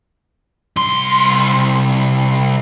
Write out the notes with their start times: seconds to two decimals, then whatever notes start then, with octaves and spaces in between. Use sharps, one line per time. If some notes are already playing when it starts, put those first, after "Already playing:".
0.77 C2 C6